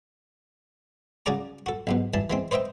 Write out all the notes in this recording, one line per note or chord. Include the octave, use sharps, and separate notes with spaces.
C#3 F#4 G#4 D5 A#5
F#4 A4
B1 G#2 B2
G2 E3 A5
E3 G#3 C4
B4 C5 D#5 E5 G5